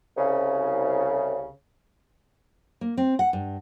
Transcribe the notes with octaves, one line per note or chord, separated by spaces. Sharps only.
C2 C#3
A#3
C4
F#5
G2